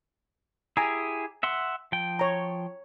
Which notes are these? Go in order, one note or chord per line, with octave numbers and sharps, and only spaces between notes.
E4 G4 G#4 G#5 A#5
E5 F#5 C6
F3 G5
C#5 A#5